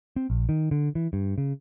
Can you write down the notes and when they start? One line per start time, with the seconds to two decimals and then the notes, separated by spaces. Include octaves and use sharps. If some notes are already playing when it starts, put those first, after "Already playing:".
0.16 C4
0.30 A#1
0.49 D#3
0.71 D3
0.95 E3
1.13 G2
1.38 C#3